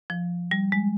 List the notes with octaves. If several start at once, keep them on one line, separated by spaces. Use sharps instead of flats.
F3
G3
G#3